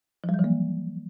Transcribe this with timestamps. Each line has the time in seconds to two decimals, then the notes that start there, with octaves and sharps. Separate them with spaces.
0.24 F3
0.29 G3
0.34 F#3
0.39 E3
0.44 A#3